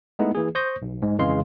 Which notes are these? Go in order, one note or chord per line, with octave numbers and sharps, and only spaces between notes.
G#3 A3 B3 D#4 E4
E3 A#3 G#4
C5 C#6 D#6 G6 A#6
B1
G#2 G#3
F2 C#3 E3 G#3 F5 C6